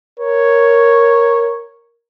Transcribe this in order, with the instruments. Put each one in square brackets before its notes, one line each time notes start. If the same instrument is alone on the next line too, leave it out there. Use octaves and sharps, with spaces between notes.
[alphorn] A#4 [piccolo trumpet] C#5